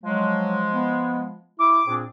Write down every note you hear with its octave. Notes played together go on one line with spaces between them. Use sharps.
F3 F#3 G#3
B3
E4 D6
A#2 C4 D4 G#4